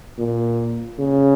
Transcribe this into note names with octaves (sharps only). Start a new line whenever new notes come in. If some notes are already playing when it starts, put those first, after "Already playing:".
A#2
C#3